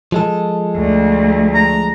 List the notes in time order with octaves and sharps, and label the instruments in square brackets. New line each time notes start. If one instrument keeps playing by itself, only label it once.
[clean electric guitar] F3 G#3 A4
[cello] D2
[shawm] A#5